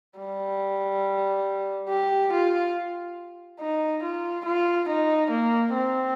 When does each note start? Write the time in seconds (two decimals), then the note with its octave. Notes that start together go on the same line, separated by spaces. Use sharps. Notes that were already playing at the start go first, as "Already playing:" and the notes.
0.19 G3
1.89 G4
2.33 F4
3.61 D#4
4.03 F4
4.45 F4
4.89 D#4
5.31 A#3
5.74 C4